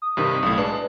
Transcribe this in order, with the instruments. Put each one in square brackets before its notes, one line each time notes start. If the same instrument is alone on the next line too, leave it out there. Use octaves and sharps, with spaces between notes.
[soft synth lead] D#6
[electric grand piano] G2 C3 D#3
B1 A2
[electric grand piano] G#3 D4 [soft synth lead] B4